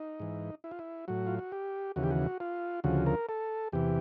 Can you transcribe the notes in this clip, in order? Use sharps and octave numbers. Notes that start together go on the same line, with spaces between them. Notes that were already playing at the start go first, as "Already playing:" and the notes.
Already playing: D#4
G#2 E3
E4
F4
E4
A2 F#3 F#4
F4
F#4
G4
D#2 C#3 E3 F#4
G4
F#4
F4
D2 C#3 F3 F#4
A#4
A4
E2 C3 E3 G4